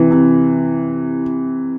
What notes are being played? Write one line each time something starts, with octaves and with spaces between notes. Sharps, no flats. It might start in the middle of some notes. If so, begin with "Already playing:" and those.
Already playing: C3 E3
C3